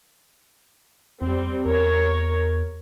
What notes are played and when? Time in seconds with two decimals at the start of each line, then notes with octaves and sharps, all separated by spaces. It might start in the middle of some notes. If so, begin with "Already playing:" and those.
1.22 F2 G3 C4
1.66 E2 A#4 C#5